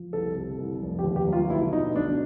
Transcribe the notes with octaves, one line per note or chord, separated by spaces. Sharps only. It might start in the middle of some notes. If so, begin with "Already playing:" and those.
Already playing: F3
C2 A4
C3
C2
F1
G4
D#2
G4
F#3
F4
B1 E4
B2 D#4
B1 D4